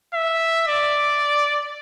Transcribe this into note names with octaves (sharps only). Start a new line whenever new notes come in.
E5
D5